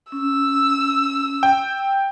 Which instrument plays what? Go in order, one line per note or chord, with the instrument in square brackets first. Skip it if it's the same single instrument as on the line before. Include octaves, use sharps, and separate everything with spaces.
[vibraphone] C#4 [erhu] E6
[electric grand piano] G5